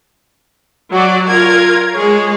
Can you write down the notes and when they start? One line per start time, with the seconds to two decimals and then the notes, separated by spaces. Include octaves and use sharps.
0.93 F#3 F#4 D5
1.28 F4 A#4 G#6
1.95 G#3 G#4 C#5